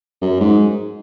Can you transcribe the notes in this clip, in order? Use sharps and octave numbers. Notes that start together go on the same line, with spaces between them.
F#2
G#2